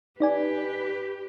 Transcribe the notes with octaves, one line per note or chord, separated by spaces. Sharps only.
D#4 G4 B4 D5 G#5